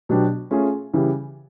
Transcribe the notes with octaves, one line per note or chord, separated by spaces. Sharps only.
B2 F#3 B3 D4 G4
A3 C#4 F4 G#4
C#3 E3 G3